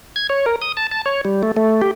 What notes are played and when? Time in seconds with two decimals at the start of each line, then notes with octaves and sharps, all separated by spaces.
0.16 G#6
0.29 C#5
0.46 A#4
0.62 D#6
0.77 A5
0.91 A5
1.06 C#5
1.25 G3
1.43 A3
1.57 A3
1.82 G4